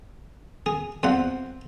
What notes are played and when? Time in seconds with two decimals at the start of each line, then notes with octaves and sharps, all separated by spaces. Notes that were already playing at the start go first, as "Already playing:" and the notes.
0.66 G#4
1.03 E2 F3 C4 F#5